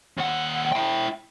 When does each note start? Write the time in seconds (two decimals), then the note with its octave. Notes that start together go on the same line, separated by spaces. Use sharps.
0.18 D#2 F#5
0.72 E4 G5